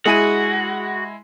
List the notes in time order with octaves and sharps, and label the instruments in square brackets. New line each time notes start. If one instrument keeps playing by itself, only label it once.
[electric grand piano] G#3 E4 D#7 [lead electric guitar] F#4 [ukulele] G#4 G#5